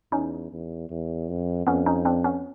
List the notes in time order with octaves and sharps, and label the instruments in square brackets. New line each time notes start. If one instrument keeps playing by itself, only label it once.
[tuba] E2 [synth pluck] C#4 D#4
[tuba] E2
E2
F2
[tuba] F2 [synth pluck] B3 C#4
[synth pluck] C#4 D#4
C4 D4
B3 C#4